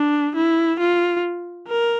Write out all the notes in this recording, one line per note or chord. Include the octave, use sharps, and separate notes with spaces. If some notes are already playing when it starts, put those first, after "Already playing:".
Already playing: D4
E4
F4
A#4